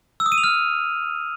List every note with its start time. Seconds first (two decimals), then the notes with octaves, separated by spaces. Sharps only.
0.20 E6
0.26 D#6
0.32 D#7
0.38 F7
0.44 F6